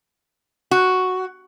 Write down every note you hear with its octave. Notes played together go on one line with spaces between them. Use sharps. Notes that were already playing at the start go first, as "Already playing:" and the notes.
F#4